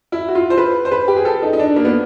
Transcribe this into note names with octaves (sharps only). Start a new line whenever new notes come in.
E4
F#4
F4
C5
B4
C5
B4
G4
G#4
A4
D#4
D#4
D4
A#3
B3